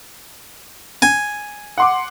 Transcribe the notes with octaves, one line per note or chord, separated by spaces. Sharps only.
G#5
F#5 C6 D6